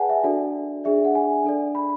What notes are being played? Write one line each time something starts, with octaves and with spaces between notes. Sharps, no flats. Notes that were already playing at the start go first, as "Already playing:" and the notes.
Already playing: G#4 B4 D5 F#5 G#5 A5
E5
D4 F#4 A4 D5
D4 G#4 D5 E5
F#5
G#5
D4 A4 D5
B5